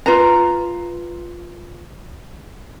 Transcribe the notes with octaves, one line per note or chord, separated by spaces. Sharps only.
F4 B4 A#5